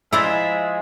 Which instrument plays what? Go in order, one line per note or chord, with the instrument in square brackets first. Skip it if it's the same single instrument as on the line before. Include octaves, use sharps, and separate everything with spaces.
[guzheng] F3 C5 A#5 [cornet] G#3 [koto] E4 D5 [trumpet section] E5